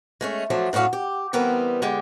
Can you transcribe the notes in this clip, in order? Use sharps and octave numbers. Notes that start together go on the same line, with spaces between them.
G#3 A3 C#4
F3 F#3 A3 D4
F#2 A2 D4 F#4 F5
G4
E3 G3 B3 C4 A#4 B4
D3 G#3 G4